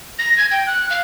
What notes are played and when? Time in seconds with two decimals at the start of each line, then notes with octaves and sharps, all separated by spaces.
0.19 A#6
0.38 G#6
0.51 G5
0.67 F#6
0.90 F5